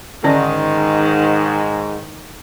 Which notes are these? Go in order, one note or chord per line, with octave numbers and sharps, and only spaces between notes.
G#2 D3 D#3 C#4 D5